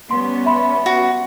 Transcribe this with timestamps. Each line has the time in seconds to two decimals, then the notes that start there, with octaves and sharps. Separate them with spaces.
0.11 G3 B3 C#4 C6
0.46 E5 B5 C6
0.86 F#4